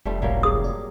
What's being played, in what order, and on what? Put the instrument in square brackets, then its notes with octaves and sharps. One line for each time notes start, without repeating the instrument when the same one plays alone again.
[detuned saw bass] F1 [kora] G3 A3 C5
[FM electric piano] B1 G#2 [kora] F#3 G3 A#3
[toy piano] G#4 D#6
[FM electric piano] D5